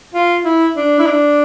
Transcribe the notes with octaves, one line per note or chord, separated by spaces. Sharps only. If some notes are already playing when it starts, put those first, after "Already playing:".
F4
E4
D4
E4
D4